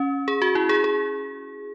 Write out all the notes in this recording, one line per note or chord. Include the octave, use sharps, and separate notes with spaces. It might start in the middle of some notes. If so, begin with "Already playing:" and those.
Already playing: C#4
G#4
F#4
E4
G#4
G#4